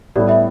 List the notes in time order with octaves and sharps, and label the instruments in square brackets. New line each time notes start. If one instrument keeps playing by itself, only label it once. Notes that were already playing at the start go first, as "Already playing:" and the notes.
[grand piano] A2 G3 B3 E4 [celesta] D5
[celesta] E5